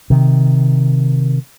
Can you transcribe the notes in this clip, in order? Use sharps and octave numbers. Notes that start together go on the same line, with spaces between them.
C3 D#3